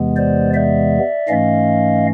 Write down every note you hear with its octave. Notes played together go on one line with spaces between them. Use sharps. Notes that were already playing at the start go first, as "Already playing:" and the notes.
Already playing: E2 C3 E3 G#3 B3
C5 D5
D5 E5
G#2 E3 A3 C#4 D#5 F5